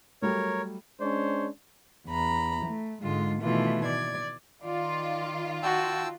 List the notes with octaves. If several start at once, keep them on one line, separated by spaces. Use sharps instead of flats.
F#3 G3 A3 A#4 C#5
G#3 C#4 D4 C5 C#5
E2 A#5 B5
A3
G#2 D3 G#3 F4
B2 D#3 E3 A3 F4
D5 G#6
D#3 F4 D5
F#4 G5 A5 E6